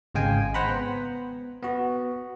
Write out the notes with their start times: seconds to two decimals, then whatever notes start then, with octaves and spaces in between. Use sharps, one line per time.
0.15 G#1 C#3 G#3 F5 G5 G#5
0.54 C5 F#5 A#5 B5
0.69 B3
1.62 B3 F#4